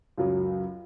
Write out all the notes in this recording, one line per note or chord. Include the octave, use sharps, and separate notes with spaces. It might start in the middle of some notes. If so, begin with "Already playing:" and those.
C#2 F#2 F#3